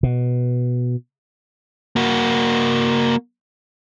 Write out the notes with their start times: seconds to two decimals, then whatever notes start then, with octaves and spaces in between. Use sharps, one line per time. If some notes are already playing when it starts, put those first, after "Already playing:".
0.03 B2
1.96 A#3 F#4